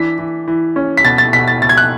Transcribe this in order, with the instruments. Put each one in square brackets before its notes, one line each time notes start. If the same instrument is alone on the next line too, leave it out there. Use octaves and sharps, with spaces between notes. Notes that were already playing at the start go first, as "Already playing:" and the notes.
Already playing: [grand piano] E3 D4 B6
E3
E3
C#4
B6
B2 A6
A6
B2 B6
A6
B2 A6
G#6
F#6